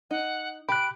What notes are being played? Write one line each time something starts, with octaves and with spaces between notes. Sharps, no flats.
D#4 F#5
G4 B5 F#6 D7